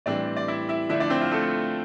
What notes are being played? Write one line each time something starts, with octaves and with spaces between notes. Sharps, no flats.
A2 E3 G3 C4 D4 D5
D5
E4 E5
E4 E5
D3 F3 A3 D4 E4 E5
D4 D5
C4 C5
F4
A3 A4